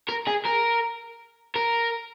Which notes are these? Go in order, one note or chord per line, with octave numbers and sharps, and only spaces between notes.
A#4
G#4
A#4
A#4